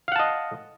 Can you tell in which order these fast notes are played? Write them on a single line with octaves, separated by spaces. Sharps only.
F5 F#5 A5 D#5